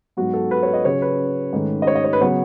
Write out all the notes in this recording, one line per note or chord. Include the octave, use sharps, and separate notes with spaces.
G#2 F#3 B3 F#4
A4
B4
C#5
D#5
C#3 F#3 C#4 C#5
B4
G#2 D#3 A3 C#4
D#5
C#5
D#5
C#5
B4
C#3 F#3 B3 C#5